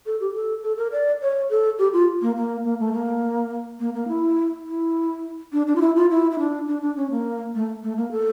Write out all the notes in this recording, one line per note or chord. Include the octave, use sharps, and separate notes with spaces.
A4
G4
A4
A4
A#4
D5
C#5
A4
G4
F4
A#3
A#3
A#3
A3
A#3
A#3
A#3
E4
E4
D4
D4
F4
E4
F4
E4
E4
D4
D4
D4
C#4
A#3
A3
A3
A#3
A4